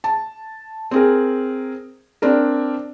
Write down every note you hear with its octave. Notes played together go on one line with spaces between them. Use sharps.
A5
C4 G#4 A#4
C4 D4 A#4